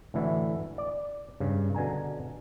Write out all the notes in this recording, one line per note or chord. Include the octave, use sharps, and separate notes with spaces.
A2 D3 E3 E4 F#4
D5
G2 C#3
B2 D3 G#5 A#5